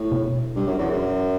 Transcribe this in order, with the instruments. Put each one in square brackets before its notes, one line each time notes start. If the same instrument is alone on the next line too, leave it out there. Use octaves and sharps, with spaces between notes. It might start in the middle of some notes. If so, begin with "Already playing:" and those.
Already playing: [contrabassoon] A2
[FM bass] B2
[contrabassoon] G2
F#2
E2
F#2